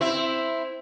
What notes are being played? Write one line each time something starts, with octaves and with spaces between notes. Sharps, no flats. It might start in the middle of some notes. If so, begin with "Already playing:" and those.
C4 E4